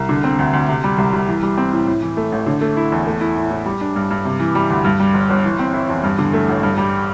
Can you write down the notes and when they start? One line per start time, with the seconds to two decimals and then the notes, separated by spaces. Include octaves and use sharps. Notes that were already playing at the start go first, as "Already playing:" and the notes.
Already playing: C2
0.09 D3
0.24 C4
0.39 D2
0.53 D2
0.69 C3
0.84 G3
0.98 C2
1.13 C2
1.28 E3
1.43 G3
1.58 C4
1.72 A2
1.87 A2
2.03 E3
2.17 A3
2.32 A1
2.46 D3
2.61 A3
2.77 E4
2.92 E2
3.06 A3
3.21 E4
3.36 A2
3.51 A2
3.66 G3
3.81 D4
3.96 G2
4.11 G2
4.25 C3
4.40 E3
4.55 G3
4.70 D2
4.85 G2
5.00 G3
5.14 G1
5.30 G1
5.45 E3
5.59 C4
5.74 E4
5.89 E2
6.03 G2
6.18 D3
6.33 A3
6.49 A1
6.63 G2
6.78 G3